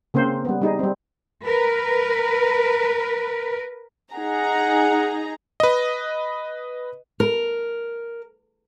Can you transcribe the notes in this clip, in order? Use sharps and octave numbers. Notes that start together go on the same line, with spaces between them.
C#3 A#3 C4 C5
G3 B3
G3 D#4 G#4
G3 C4
A#4 B4
D#4 G#4 F#5 A#5
B4 D#5
A#4